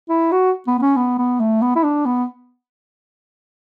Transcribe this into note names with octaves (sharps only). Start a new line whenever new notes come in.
E4
F#4
B3
B3
C#4
B3
B3
A3
B3
E4
D4
B3